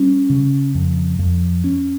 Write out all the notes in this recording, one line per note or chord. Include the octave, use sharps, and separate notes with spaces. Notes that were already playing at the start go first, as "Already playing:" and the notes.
Already playing: G3 C#4
C#3
F2
F2
C#4